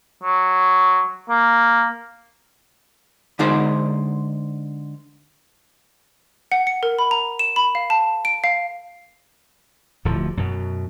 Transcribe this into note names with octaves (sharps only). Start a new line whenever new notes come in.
F#3
A#3
D3 G#3 D#4 A#4 C5
F#5
C#7
A#4
B5
A#5
E7
B5
F5
A5
D7
F5
D1 A2 F3
F#2 B2